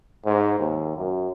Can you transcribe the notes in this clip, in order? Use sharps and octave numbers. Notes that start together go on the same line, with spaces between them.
G#2
D#2
F#2